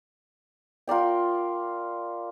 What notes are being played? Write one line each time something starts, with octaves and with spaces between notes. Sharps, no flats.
F4 A#4 D5 G5